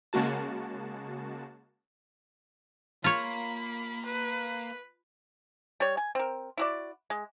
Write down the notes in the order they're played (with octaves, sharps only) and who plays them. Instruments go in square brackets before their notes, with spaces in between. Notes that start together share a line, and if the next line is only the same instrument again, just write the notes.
[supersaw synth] C#3 G#3 A#3 F#4 A5
[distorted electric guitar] A#3 [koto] F4 C#5 [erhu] B5
[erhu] B4
[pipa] G3 C#5
G#5
C4 A#4
E4 F#4 D5
G#3